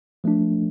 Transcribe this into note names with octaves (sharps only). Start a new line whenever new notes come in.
F3 A3 D4